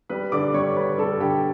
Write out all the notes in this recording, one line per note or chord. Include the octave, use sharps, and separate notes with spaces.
G3 B4 B5
D3 D5 D6
G3 C#5 C#6
D3 B4 B5
G3 A4 A5
D3 G4 G5